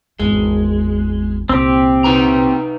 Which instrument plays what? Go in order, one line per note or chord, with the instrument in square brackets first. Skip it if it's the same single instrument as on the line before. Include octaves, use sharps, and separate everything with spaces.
[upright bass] G#1 E2 [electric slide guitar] G#3
[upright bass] C2 A#2 [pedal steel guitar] C4 G4
[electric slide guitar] D#4 B4 A#5